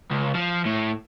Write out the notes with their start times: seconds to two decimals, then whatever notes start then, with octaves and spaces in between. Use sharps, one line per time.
0.10 C#2
0.35 F3
0.65 A2